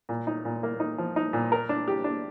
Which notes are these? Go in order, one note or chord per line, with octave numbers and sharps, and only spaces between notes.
A#2
D#4
A#2
A#3
D#4
F3
D#4
A#2
A#4
D4
G4
D4